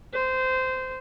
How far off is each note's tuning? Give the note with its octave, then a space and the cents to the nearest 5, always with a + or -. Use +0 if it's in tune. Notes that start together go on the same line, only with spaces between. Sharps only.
C5 -20